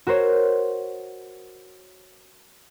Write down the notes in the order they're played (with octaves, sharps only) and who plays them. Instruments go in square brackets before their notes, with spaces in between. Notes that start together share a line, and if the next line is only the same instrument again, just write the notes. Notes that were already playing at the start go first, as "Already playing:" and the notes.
[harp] F#4 A#4 C5 C#5